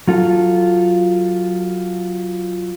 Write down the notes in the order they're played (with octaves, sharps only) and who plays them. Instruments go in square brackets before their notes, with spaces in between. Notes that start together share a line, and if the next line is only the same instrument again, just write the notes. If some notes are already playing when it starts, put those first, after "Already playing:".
[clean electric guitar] F#3 F4 A4